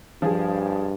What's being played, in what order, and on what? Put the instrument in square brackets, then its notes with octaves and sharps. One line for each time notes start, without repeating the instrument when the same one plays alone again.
[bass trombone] G2 [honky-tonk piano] F3 G#4